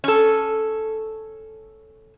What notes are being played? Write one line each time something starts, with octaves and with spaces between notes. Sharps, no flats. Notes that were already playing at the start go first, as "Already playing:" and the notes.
C#4 A4